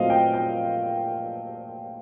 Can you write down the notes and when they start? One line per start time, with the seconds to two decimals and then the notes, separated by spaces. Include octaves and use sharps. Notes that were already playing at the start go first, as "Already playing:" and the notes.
Already playing: A#2 F#3 A3 C4 D#5 F5
0.10 G5
0.33 G5